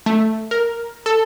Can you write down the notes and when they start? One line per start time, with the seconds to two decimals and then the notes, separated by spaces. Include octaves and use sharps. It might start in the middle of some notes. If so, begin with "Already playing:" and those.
0.06 A3
0.51 A#4
1.06 A4